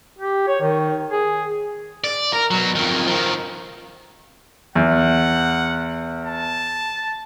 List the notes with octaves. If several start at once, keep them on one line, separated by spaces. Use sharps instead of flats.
G4
C#5
D#3
G#4
D5
A#4
B2 F#3
F2 D#3
D#3 F3
E2 F#5
A5